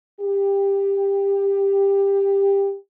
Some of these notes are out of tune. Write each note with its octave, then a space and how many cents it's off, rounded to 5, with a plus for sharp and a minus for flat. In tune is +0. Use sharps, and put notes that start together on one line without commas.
G4 +15